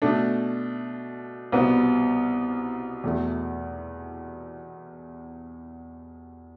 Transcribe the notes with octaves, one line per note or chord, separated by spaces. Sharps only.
B2 A3 D4
C2 B2 B3
E2 B2 A3